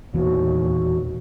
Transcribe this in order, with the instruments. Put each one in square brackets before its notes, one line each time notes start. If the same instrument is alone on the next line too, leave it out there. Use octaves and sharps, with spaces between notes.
[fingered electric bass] E1 E3 B3 [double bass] D#2 A#2 [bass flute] F#4